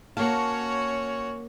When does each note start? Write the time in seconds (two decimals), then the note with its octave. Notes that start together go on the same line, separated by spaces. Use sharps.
0.17 A#3 C#4 F#4 C#5 F5 A5